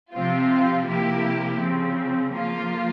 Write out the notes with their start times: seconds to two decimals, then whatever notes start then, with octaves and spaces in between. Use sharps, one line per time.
0.14 C3 F3 C4 F4
0.87 C3 F3 A#3 E4 G4
1.60 C#3 F3 C4
2.32 F3 A#3 F4